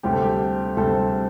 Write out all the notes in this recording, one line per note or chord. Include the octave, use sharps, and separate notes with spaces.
D2 C3 G3 C4 G4
A4
G4
D2 C3 G3 C4 A4